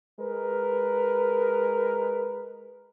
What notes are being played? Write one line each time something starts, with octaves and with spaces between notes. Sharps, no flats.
G#3 A#4 B4